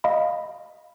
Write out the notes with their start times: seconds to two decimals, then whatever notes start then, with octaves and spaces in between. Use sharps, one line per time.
0.04 D#5 F5 B5